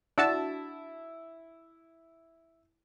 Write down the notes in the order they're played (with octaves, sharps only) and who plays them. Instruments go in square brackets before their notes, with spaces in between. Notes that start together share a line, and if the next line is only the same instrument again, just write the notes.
[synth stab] D4 F#4 A5 [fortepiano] E4 E6